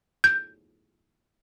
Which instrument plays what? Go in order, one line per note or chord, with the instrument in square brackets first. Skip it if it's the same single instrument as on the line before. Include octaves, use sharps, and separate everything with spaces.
[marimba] G6